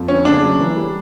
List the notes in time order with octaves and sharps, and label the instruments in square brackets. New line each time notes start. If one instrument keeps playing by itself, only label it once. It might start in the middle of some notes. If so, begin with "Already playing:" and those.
Already playing: [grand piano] F2
[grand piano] D3 [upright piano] C#4
[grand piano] C#3 [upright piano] D4
[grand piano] F#3
E3
G3